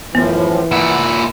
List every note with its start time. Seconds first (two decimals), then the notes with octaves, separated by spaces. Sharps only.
0.15 F#2 A2 E3 F3 B3
0.72 A#2 E4 F#5